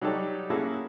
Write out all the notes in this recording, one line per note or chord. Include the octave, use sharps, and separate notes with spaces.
F#3 G3 D#4 G4 A4 C#5
A#3 C#4 E4 F#4 G#4 A4